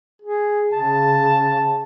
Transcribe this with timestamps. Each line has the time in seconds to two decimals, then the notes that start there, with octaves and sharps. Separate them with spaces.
0.22 G#4
0.73 C#3 A5